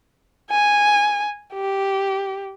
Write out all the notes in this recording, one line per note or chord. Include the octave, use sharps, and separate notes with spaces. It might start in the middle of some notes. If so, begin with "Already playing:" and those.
G#5
G4